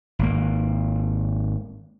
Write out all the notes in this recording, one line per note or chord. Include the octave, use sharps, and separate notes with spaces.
G#1 A#3